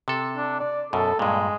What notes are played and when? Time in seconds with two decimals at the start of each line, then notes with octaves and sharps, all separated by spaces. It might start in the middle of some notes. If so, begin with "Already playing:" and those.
0.08 C3 A4
0.36 D4
0.59 D5
0.93 F#2 B2 A4
1.19 G2 A#2 G#3